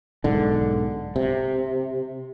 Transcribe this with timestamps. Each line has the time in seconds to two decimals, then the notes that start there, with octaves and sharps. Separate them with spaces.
0.24 B1 G#2 D3
1.16 C3